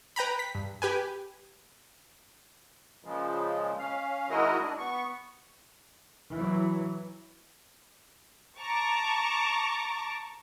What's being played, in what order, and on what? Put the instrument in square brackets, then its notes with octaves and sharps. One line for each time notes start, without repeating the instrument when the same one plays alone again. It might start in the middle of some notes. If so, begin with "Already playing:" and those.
[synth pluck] B4 G5 A#5 B5
B6
G2
G4 B4 G#5
[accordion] A#2 C#3 F3 G#3
C#4 F5
D#3 G#3 E4 F#4 A#4 D#5
D4
B3 C#6
[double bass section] E3 F#3
[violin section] A5 A#5 C#6 D6